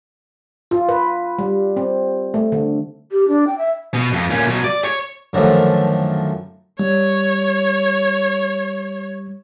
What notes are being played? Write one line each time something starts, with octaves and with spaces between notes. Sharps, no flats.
F4
B4
G3
C4
A3
D3
G4
D4
G5
E5
B2
F2
A#2 C#4
B2 F#3
D5
C#5
F#2 D3 D#3 F3 A3
G3 C#5